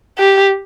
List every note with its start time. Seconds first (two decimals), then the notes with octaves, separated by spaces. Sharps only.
0.19 G4